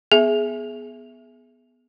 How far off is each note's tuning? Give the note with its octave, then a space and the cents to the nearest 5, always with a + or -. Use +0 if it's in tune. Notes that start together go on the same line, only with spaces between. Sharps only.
B3 +0 G#4 +15 E5 +0